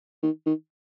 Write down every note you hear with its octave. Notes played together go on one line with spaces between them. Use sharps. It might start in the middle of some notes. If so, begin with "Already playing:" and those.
D#3
D#3